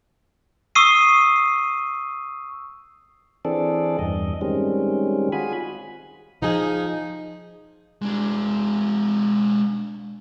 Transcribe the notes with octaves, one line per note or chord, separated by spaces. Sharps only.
C#6 D#6 E6 C7 D#7
E3 C4 D4 G#4 A4 D5
E2 G2 D#5
D#3 G3 G#3 C4 C#4
F4 F#4 G#4 G#5 B5
F3 D#4 G#4
G#3 D4